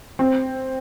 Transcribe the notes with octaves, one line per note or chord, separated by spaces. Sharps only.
C4